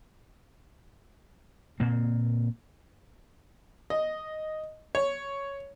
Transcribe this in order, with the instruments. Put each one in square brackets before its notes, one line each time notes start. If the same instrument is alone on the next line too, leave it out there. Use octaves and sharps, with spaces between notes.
[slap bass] A#2 A#3 C4
[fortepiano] D#5
C#5